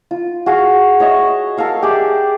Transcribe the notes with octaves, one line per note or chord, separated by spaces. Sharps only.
F4
F#4 G#4 F5
C#5 D#5 E5 C#6
A4 A#4 F5 C#6
G4 G#4 D5 E5